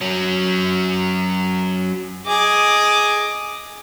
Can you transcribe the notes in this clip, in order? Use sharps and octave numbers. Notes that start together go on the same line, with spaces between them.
F#3 C#4
G#4 D#5 D6